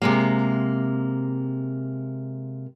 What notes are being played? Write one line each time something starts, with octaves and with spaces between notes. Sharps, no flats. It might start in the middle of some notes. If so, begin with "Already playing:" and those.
C3 G#3 A#3